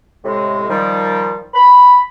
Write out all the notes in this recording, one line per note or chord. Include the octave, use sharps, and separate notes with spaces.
A2 C3 G#3
D#3 F3 G3
B5